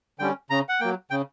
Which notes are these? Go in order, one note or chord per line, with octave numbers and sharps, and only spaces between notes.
D3 G3 C#4 G5
C#3 A#5
F#5
F#3 A#3 G5
C#3 G5